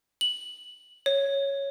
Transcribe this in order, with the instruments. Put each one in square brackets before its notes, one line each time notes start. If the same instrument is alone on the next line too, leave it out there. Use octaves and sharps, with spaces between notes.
[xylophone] F#7
C#5